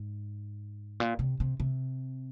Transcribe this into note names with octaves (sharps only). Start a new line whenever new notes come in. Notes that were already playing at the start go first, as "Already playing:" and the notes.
Already playing: G#2
A#2
C3
C3
C3